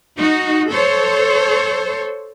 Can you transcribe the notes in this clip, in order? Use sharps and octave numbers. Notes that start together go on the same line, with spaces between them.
D#4 F#4
A4 C5 C#5